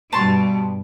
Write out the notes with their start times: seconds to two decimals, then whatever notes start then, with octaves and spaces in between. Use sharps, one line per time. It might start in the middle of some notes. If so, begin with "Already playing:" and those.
0.13 G2 B2 G3 A5 C6 C#6